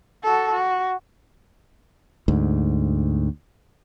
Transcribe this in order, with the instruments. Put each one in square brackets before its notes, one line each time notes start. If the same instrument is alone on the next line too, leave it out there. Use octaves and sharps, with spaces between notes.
[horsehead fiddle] F#4 A4
F#4
[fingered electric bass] D2 G#2